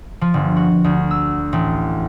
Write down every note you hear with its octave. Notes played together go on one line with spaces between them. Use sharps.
F3
G1
F#4
D2
E6
A1